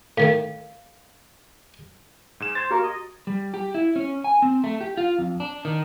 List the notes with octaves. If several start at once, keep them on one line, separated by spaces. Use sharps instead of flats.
A2 D#3 A3 F5
G#2 G#4 E7
C5 G#6 A6
A#3 F#4 G4 A#4
D#5
G3
G4
E4
C#4
G#5
C4
A3
G4
F4
F2
D4
D#3